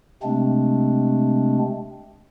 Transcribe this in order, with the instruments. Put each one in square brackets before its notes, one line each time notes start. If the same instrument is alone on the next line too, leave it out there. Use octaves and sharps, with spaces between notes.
[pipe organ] C3 G#3 A3 C4 D4